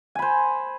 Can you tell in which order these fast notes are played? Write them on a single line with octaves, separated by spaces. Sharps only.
G#5 B5 C5